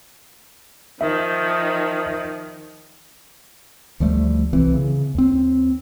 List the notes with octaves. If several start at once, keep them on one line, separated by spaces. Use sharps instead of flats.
D#3 F3 E5
D2 F3 G3 A3
C2 E3 C4
C#3
D#2 C4